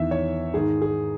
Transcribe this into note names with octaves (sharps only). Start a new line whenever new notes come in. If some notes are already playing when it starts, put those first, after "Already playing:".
Already playing: E2 D#3 E5
C#5
G#2 D#3 G#4
G#4